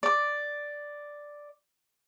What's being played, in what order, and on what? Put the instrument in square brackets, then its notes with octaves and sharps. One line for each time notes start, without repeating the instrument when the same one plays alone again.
[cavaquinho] D5 D6